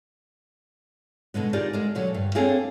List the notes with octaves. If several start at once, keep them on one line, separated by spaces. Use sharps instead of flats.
B2 D3 G#3 B3
D#4 F4 G4 G#4 A#4 D5
D3 G#3 A#4
A#2 D3 F#3
G2
A#3 C4 D4 G#4 A4 C#5